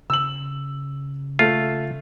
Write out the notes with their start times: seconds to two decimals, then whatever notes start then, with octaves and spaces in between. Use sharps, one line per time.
0.10 C#3 E6 F#7
1.39 A3 F4 A4